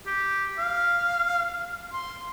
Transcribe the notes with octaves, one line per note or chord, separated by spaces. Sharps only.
G4
F5
C6